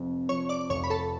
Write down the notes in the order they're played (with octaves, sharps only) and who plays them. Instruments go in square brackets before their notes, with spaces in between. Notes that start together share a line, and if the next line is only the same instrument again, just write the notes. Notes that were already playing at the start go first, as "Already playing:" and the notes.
Already playing: [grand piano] F1 F2
[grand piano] F3 [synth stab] C#5 C#6
[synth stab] D5 D6
[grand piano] F1 [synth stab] C#5 C#6
[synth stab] B5
A4 A5